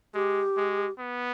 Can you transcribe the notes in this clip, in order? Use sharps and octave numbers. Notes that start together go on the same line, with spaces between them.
G#3 G4
G#3
B3